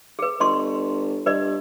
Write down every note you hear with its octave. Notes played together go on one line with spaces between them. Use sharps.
G#4 B4
G1 D#5 C6 C#6
G2 B4 D5 D#5